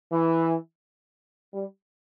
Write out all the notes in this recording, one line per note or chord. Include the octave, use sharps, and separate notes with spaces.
E3
G3